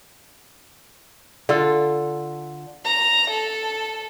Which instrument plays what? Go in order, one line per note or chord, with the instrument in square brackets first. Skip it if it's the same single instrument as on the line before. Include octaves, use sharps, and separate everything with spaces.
[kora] D3 F4 A4
[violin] A#5
A4